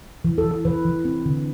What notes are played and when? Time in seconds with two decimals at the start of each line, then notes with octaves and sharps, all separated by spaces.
0.25 E3
0.38 A4
0.45 E3
0.51 A4
0.65 E3 B4
0.85 E3
1.05 C4
1.26 D3